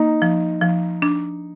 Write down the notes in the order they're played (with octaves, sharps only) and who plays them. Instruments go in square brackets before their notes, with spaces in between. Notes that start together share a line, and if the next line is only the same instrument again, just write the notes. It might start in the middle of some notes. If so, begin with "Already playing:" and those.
Already playing: [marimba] A#3 [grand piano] D#4
[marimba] F3
F3
D4